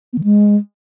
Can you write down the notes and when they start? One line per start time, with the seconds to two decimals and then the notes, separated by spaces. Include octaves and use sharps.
0.13 B3
0.18 D#3
0.24 G#3